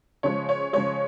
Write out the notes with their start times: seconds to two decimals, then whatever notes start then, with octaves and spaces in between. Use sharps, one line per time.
0.23 C#3 F3 G#3 C#5
0.49 C#5
0.73 C#3 F3 G#3 C#5